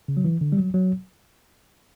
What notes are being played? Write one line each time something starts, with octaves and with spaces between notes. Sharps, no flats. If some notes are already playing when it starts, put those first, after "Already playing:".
C#3
F#3
E3
D3
G3
F#3
F#3